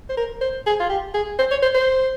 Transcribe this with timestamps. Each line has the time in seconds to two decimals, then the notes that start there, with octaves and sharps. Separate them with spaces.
0.09 C5
0.17 A#4
0.41 C5
0.67 G#4
0.80 F4
0.90 G4
1.14 G#4
1.39 C5
1.51 C#5
1.62 C5
1.75 C5